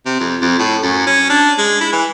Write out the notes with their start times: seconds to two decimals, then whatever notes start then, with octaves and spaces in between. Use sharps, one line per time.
0.06 C3
0.20 F2
0.42 F2
0.59 A2
0.83 F#2
1.07 C#4
1.30 D4
1.58 G#3
1.81 E4
1.92 E3